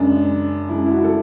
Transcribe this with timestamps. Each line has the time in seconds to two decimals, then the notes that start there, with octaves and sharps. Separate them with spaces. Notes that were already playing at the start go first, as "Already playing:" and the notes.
Already playing: F#2 C#3 G#3 D4
0.69 F#2 C#3 G#3 E4
0.86 E4
0.91 F#4
1.04 A4